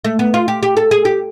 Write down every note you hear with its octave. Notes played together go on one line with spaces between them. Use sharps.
A3
B3
F4
G4
G4
A4
G#4
G4